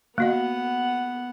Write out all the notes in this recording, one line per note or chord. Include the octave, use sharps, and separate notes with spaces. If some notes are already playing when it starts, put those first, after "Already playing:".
A#3 B3 F#4 D#5 F#5